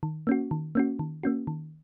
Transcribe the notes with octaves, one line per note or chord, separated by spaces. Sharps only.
D#3
A#3 C#4 F#4
D#3
A#3 C#4 F#4
D#3
A#3 C#4 F#4
D#3